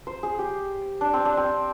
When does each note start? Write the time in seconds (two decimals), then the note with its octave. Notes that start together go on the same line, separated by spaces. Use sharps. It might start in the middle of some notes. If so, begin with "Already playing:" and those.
0.07 C5
0.23 G#4
0.39 G4
1.01 D4
1.14 C4
1.25 D4
1.37 C4